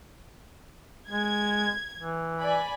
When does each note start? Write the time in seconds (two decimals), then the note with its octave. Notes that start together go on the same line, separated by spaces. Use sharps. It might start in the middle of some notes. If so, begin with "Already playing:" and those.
1.09 G#3 G#6
1.99 E3
2.41 D5 G#5 B5